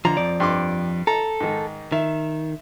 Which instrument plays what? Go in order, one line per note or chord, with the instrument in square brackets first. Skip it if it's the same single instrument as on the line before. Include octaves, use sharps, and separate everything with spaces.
[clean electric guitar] D3 F3 [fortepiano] A#5
[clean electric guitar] F2 F3 D5
[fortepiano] G2 C6 D6
[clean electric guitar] A4 [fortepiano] A#5
[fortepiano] G#2 D#3
[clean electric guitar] D#3 [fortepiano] E5